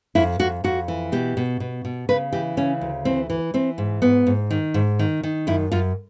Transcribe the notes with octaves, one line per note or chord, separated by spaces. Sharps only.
F2 E4
F2 F#4
F2 F#4
E3
B2 G4
B2
B2
B2
C#3 B4
E3 G4
C#3 C#4
D2
E3 C4
E3
E3 C4
G#2
G#2 B3
G#2
D#3
G#2
D#3
D#3
F#2 E4
F#2 F4